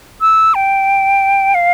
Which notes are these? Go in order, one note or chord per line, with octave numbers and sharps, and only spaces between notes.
E6
G5
F5